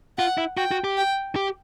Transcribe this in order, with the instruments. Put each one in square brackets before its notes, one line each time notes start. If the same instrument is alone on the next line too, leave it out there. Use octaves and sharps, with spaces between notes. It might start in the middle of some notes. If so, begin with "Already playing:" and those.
[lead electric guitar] F4 [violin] F#5
[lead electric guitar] E4
[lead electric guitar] F#4 [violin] G5
[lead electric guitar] F#4
G4
[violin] G5
[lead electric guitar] G4